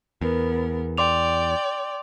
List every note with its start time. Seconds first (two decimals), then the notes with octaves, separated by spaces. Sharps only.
0.21 E2 B3 A#4
0.98 D5 G5 C6 D6 F7